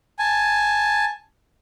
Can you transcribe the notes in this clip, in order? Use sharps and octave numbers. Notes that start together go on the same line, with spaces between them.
G#5 A5